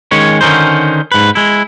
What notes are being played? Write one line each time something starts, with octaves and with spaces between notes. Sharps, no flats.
D#3 G#3 C#4 C#5
D3 D#3 C#4 D#4 C5
G#2 B4
G#3 E4